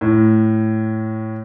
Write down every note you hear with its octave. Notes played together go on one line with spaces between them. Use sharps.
A2